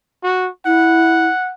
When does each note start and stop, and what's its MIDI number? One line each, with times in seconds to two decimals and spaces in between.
0.23 0.49 66
0.66 1.26 64
0.66 1.54 78